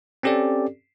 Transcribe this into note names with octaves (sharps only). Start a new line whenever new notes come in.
C4 C#4 G4 A4 D5